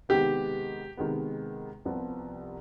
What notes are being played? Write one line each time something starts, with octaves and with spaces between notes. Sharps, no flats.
C3 D#3 G#3 B3 G4
C3 D#3 G#3 B3
C2 C3 F3 B3